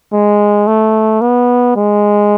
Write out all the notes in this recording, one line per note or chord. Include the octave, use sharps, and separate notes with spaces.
G#3
A3
B3
G#3